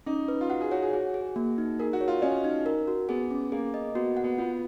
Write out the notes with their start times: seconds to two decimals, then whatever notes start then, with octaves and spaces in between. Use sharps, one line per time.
0.06 C#4 D#4
0.28 B4
0.41 F4
0.50 F#4 F#5
0.61 G#4
0.71 F#4 C#5
0.82 G#4
0.93 F#4 G#4
1.14 G#4
1.36 A#3
1.58 D#4
1.80 G#4 A#4
1.93 F#4
2.01 C#5
2.08 F4
2.22 C#4 D#5
2.44 D#4
2.66 A#4
2.87 F#4
3.09 B3 G#4
3.31 C#4
3.52 A#3 G#4
3.74 D#5
3.95 B3 F#4
4.17 F#5
4.24 B3
4.38 B3 F4